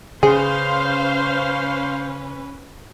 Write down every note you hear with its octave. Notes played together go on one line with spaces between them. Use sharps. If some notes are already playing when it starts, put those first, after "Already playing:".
C#3 C#4 G#4 B4 C5 F5